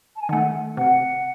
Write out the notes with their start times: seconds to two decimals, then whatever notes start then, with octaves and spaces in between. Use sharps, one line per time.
0.15 A5
0.21 G#5
0.29 D#3 A3 F#5
0.77 C3 F#5